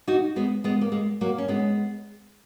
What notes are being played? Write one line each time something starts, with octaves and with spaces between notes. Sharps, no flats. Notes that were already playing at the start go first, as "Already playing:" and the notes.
D#4 F#4
G#3 B3
G#3 B3
A#3
G#3
F#3 A#3
C#4
G#3 B3